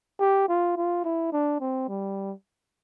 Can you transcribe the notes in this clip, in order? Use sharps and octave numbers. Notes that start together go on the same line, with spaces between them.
G4
F4
F4
E4
D4
C4
G3